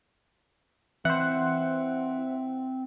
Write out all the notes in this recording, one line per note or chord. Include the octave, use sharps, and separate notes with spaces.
E3 C4 C5 E5 F#5